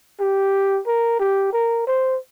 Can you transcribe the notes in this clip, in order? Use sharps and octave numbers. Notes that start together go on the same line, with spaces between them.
G4
A#4
G4
A#4
C5